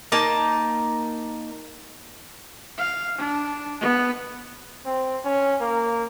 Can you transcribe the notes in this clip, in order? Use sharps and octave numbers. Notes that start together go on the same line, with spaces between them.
A#3 D#4 A5
F5
D4
B3
C4
C#4
A#3